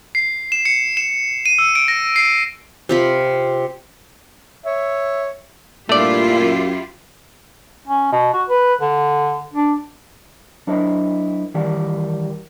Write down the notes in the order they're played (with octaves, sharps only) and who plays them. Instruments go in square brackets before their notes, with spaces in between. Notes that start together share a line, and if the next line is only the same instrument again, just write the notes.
[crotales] C7
E7
C#7
E7
D#7
E6
D7
A#6
C7
[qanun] C3 F4 B5
[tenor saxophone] C#5 [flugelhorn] E5
[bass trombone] G2 [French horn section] A#2 [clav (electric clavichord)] A3 D5 [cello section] E4 F4 G4
[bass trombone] F#2
[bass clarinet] C#4
B2
F#4
B4
D3
D4
[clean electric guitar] F#3 D4 E4 A#4 C5 D#5
D#3 E3 G3 G4 A#4 D5